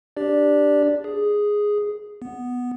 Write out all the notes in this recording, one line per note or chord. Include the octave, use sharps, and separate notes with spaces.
D4 G4 D5
G#4
B3